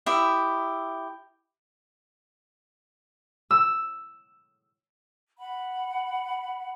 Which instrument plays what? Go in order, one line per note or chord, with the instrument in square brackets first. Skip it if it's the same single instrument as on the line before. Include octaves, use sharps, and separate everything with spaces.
[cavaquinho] E4 G4 D#5 E5
[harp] E6
[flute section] F#5 B5